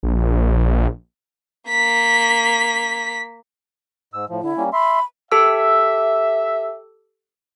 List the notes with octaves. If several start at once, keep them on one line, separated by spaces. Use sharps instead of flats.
A#1
A#3 B6
G#2 E6
A2 F3
D3 E4
G3 A#3 C#4
E5 B5 C6
G4 A4 E5 E6